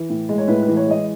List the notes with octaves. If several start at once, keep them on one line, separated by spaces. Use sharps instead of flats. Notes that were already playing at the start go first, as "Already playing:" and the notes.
Already playing: E3
A2
G#3
C#5
A2 B4
E3 B4
C#5
G#3 D#5